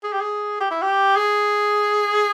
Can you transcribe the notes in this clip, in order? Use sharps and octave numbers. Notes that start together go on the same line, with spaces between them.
G#4
G4
G#4
G4
E4
G4
G#4